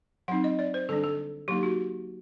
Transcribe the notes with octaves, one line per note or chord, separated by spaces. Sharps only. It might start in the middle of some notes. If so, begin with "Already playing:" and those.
F#3 C4 D#4 F#5
D#5
D5
C5
D3 G3 D4 A4
A4
F#3 A#3 D#4 G4
F#4